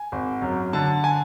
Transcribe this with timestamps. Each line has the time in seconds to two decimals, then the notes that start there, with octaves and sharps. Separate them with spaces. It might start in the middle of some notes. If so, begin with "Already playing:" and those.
Already playing: G#5
0.12 G#1
0.42 F#2
0.73 D3 A5
1.04 G#5